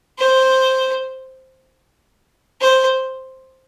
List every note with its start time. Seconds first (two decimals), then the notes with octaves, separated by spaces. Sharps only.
0.19 C5
2.61 C5